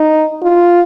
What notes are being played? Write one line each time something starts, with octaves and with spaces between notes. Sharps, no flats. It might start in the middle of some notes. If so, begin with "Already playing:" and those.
Already playing: D#4
F4